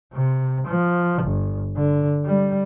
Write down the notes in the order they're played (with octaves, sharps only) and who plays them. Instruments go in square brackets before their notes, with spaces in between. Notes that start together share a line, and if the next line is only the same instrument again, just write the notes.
[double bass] C3
F3
G1
D3
G3